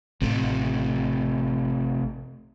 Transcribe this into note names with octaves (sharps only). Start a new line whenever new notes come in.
A1 C3 A3